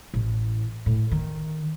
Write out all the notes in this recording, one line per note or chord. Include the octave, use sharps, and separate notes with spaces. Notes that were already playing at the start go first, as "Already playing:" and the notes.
A1
A2
D#3